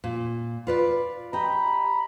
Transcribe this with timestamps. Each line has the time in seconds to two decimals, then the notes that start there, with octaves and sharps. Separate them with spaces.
0.04 A#2
0.67 F4 B4 D5
1.33 G4 D#5 A#5 B5